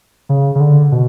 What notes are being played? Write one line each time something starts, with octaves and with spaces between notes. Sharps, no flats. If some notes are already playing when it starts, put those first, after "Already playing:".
C#3
C#3
D3
B2